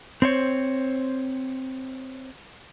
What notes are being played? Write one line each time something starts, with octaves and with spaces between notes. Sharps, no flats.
C4 C5 C#5